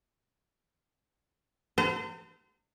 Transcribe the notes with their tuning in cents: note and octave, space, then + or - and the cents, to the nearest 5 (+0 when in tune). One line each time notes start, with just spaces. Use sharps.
C5 -35 A#5 -45